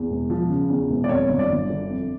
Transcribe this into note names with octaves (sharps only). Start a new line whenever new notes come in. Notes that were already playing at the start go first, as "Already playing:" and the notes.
Already playing: E2
E1
F3
C#3
E2
E1
D5
F2 C#5
G1
D5
G1
D3
F2